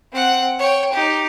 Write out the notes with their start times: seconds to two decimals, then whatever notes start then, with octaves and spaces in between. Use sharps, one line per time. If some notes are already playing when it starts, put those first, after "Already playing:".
0.12 C4 F#5
0.58 C#5 G5
0.92 D#4 G4